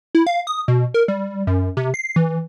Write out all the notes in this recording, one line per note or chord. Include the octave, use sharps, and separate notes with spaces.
E4
F5
D#6
B2
A#4
G3
F#2
C3
C7
E3